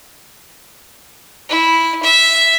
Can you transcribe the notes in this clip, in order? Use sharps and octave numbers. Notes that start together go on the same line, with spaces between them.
E4
E5